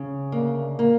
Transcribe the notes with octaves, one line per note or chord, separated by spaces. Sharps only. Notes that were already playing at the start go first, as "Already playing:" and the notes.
Already playing: C#3
D2 A#3
A#3